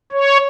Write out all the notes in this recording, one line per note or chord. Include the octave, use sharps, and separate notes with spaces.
C#5